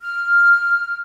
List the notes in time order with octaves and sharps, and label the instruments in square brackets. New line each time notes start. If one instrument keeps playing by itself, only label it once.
[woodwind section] F6